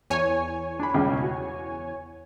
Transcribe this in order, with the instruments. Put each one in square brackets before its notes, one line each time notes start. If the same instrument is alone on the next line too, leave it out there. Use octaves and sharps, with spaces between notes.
[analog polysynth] E2 C#5 G#5
[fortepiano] D4 B5
C#2 C#3 G3
F#4